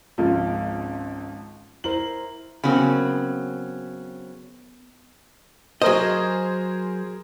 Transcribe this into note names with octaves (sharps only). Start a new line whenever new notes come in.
G#1 C#2 F3 F4
E4 A#4 C5 F#7
C#3 F#3 B3 C4 A#4
F#3 G#4 A#4 C5 D#5